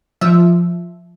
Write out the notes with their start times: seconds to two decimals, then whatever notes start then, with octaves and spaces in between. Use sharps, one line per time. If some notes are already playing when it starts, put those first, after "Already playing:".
0.21 F3 E5